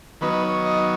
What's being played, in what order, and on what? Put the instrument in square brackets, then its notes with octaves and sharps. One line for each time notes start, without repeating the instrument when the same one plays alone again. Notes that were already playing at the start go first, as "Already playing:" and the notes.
[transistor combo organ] D#3 F#3 B3 D#4 B4
B4
C#5
D#5